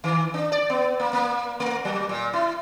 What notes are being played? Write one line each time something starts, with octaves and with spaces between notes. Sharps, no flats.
D#3
D4
D5
B3
A#3
A#3
A3
F#3
A#2
E4